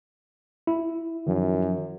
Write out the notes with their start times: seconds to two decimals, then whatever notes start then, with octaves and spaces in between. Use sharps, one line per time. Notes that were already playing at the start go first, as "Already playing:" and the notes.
0.67 E4
1.27 F#2 D#3 F3